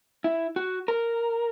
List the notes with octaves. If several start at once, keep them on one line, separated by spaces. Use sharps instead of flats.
E4
F#4
A#4